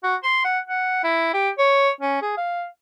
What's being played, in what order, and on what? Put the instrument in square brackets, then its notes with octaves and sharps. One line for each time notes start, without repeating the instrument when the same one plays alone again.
[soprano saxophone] F#4
C6
F#5
F#5
E4
G4
C#5
C#4
G#4
F5